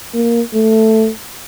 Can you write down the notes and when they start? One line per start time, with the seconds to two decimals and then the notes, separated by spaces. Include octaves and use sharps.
0.14 A#3
0.54 A3